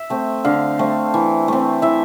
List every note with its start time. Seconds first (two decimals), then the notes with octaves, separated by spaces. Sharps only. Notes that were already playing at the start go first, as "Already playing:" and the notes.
Already playing: E5
0.10 A3 C4
0.45 D3 F5
0.79 A3 C4
1.14 E3
1.48 A3 C4
1.82 E3 E5